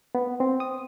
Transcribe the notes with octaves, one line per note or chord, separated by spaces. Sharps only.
B3
C4
D#6